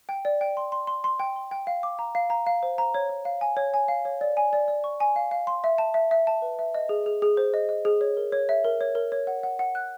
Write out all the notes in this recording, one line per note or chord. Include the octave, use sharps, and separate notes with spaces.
G5
D5
G5
C6
C6
C6
C6
G5
C6
G5
F5
D6
A#5
F5
A#5
F5
C5
A#5
C#5
C#5
F5
G#5
C#5
G#5
F5
C#5
D5
G#5
D5
D5
C#6
G#5
F5
F5
C6
E5
A5
E5
E5
A5
B4
E5
D#5
G#4
G#4
G#4
C5
D#5
D#5
G#4
C#5
A#4
C#5
E5
A#4
C#5
A#4
C#5
F#5
F#5
F#5
F#6